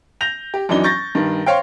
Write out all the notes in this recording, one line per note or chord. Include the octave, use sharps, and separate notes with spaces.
G6 A#6 F7
G4
F#2 E3 D4 D#4 G7
C#6 G6 A6 A#6
G2 D#3
C5 C#5 F5 G5